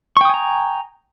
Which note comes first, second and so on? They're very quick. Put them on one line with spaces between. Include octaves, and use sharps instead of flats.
C#6 G5 D#6 G#5 A#5